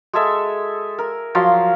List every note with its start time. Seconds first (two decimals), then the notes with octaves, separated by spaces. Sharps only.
0.13 G#3 G#4 A4 E5
0.99 A#4
1.35 F3 F#3 F5 C6